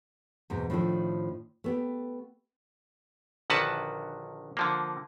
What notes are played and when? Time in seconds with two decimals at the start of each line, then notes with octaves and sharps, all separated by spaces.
0.50 E2 G#2 B2
0.70 A2 D#3 F3 A3 D4
1.64 A3 B3 G4
3.50 A#1 D3 D#3 F#4 B4 A5
4.57 D3 F3 A#3